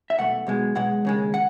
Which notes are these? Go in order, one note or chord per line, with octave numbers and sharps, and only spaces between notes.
E5
B1 B2 A3 F#5
B1 B2 G#3
B1 B2 G#3 F#5
D#2 C#3 G#3
F#5